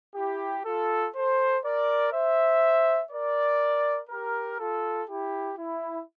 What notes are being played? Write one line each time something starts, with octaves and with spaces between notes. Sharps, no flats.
E4 G4
F4 A4
A4 C5
A#4 D5
C5 E5
A#4 D5
G4 A#4
F4 A4
E4 G4
E4